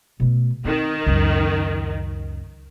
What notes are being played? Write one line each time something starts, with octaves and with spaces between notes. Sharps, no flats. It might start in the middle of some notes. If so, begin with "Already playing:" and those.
B2 A3
D#3 C4
C#2 F#2